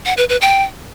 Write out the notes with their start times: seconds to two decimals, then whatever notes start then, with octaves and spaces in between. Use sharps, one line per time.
0.05 F#5
0.17 B4
0.29 B4
0.41 G5